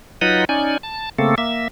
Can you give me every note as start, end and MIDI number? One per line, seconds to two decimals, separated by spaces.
0.21 0.45 54
0.21 0.45 63
0.21 0.45 65
0.21 0.45 71
0.21 0.45 75
0.21 0.45 78
0.49 0.77 61
0.49 0.77 63
0.49 0.77 74
0.49 0.77 80
0.83 1.09 81
1.19 1.35 49
1.19 1.35 57
1.19 1.35 58
1.19 1.35 60
1.19 1.35 69
1.38 1.68 58
1.38 1.68 76